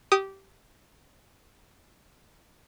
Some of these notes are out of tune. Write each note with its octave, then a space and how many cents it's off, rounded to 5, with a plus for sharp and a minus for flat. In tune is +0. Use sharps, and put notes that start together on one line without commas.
G4 -15 D#6 +0